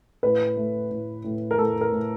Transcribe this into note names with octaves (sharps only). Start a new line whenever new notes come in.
A2 B4
A3
A2
A2
A#4
A2 A4
A#4
A2